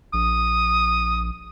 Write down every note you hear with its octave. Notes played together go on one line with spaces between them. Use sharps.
A#1 D#6